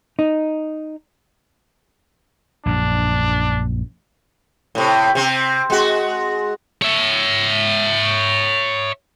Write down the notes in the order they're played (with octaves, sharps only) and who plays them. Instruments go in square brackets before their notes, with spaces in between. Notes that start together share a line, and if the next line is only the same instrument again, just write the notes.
[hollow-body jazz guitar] D#4
[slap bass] A#1 F#2 [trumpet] D4
[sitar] A2 C3
C3 C4
G#3 F#4
[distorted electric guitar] C#5 E5